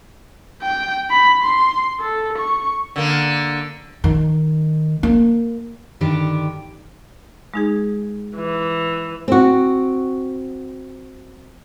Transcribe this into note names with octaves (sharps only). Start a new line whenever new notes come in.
G5
B5
C6
A4
C#6
D3 A#3
D#3
A#3
G2 D3 D#3 D4 G4
G#3 D#4 G#4
E3
C4 F#4